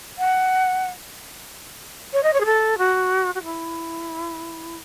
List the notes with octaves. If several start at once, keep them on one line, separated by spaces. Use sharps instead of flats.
F#5
C#5
D#5
C#5
G#4
A4
F#4
F#4
E4